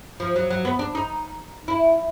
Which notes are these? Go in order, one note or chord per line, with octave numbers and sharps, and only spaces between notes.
F3
F#3
F#3
B3
D4
D#4
E4